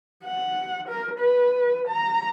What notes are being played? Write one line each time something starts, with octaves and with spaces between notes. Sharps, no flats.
F#5
A#4
B4
A#5